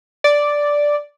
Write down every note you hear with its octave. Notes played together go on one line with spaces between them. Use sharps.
D5